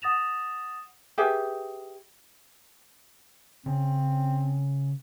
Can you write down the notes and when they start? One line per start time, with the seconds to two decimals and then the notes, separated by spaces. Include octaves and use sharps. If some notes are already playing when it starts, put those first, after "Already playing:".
0.02 F#5 D#6 A6 A#6 E7 F7
1.18 G4 G#4 B4 E5
3.66 C#3 C4 C#4